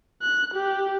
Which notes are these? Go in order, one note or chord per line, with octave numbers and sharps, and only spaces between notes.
F#6
G4